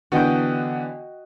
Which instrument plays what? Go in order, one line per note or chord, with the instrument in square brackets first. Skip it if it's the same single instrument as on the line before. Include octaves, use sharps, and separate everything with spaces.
[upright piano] D3 E3 B3 [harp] F#4 D#5 G5